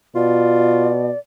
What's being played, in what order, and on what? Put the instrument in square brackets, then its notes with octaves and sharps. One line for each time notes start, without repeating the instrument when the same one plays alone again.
[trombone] B2 [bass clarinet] F4 [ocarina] D5